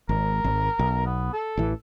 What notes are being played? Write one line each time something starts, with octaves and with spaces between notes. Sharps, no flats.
G#1 A#4
G#1
B1
B3
A4
A1 E3